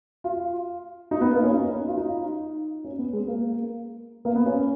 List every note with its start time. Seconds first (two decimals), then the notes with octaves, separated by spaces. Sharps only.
0.24 F4
1.11 D#4
1.21 B3
1.33 A#3
1.43 C#4
1.54 D#4
1.88 F4
1.97 D#4
2.84 C#4
2.99 B3
3.13 G#3
3.27 A#3
4.25 A#3
4.36 B3
4.46 C#4